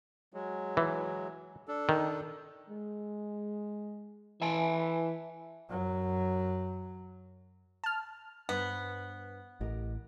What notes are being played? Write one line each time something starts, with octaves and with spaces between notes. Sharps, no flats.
F#3 G#3
E3
D4 A4
D#3
G#3
E3 E5 G#5 A5
F#2 F#3
A5 F6
G2 B3 C5
A1 G4 A#4 D#5